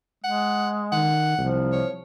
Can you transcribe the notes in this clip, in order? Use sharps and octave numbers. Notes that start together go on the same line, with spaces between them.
G#3 F#5
D#3 F#5
C2 F3
C#5